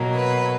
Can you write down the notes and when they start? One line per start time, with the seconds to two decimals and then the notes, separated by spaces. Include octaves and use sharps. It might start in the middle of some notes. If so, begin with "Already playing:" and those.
Already playing: B2 F#3 A#3
0.15 B4